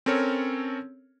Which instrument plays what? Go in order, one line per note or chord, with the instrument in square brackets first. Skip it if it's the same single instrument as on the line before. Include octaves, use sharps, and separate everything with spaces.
[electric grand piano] C4 C#4 A4 A#4 C#5